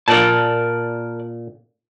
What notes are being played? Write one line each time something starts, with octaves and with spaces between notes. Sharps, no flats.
A#2 A#4 D5 A5